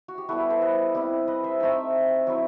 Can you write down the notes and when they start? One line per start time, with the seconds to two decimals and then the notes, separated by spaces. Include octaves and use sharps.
0.08 F#4
0.18 G4
0.29 G3 B3 E4 F#4 A4
0.40 G4 B4
0.50 A4 C5
0.62 B4 D#5
0.95 G3 C4 E4
1.27 B4 D#5
1.44 C5 E5
1.60 A3 C4 D#4 E5 G5
2.27 F#3 C4 E4